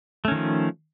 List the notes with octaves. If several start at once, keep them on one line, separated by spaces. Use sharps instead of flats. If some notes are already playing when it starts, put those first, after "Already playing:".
D#3 F3 A3 C#4